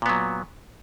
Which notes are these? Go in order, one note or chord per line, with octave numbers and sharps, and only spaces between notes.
A#2 F#3 B3